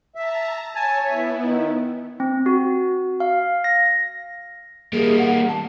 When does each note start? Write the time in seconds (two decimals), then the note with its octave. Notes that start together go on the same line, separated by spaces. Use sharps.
0.15 E5 A5 A#5
0.75 C#5 G#5 A5
1.06 B3 E4 E5
1.42 D#3
2.20 C4
2.46 F#4
3.20 F5
3.64 A#6
4.93 G3 A#3 G#4
5.18 F#5
5.48 A5